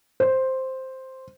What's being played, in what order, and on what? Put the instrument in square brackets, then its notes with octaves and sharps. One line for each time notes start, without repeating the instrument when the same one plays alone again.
[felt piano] C5